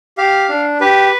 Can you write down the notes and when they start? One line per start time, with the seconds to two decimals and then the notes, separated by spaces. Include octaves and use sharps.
0.18 G4 F5
0.49 D4
0.80 G4 B4